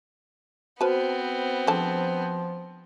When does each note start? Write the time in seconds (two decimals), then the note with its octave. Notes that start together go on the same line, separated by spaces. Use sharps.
0.81 B3 C4 F#4 B4 C5 A5
1.67 D3 F3 G#3 A5